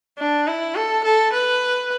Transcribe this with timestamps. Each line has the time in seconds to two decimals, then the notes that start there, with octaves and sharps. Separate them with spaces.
0.19 D4
0.47 E4
0.75 A4
1.05 A4
1.33 B4